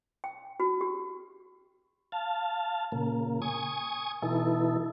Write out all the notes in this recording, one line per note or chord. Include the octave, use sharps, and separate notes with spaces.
G5
F#4
G4
F5 A5
A#2 C#3 A#3
G#5 C#6 D#6
B2 E3 D#4 E4 A4